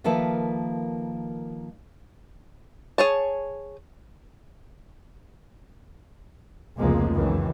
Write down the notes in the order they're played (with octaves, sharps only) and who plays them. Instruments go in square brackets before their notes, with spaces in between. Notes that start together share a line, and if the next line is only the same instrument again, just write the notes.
[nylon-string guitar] D#3 F3 A#3 A4 B4 E5
[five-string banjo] G#4 C#5 A5
[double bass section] F1 C#2 F3 F#3 G#3 A#3
C#2 F#2 D#3 E3